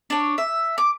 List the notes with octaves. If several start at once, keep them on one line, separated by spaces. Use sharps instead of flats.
D4 C#5
E5
D6